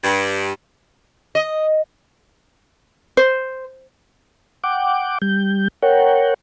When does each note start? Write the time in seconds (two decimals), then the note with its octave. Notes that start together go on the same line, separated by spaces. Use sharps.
0.04 G2
1.35 D#5
3.17 C5
4.64 F#5 G5 D6
5.22 G3 G6
5.83 A#4 C#5 F#5 G5